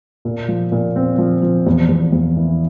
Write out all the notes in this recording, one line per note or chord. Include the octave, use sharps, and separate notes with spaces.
A#2
F3
A#2
C4
F3
F3
E2
E2
E2
E3